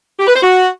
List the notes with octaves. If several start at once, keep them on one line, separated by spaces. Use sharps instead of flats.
G4
B4
C5
F#4